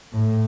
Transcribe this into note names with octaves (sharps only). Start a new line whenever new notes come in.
A2